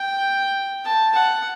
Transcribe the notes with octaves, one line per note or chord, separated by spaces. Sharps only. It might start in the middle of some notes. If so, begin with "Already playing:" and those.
Already playing: G5
A5
F#5